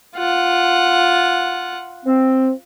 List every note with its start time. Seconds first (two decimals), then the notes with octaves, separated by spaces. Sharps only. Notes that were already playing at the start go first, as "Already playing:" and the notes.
0.16 F4 F#5
2.04 C4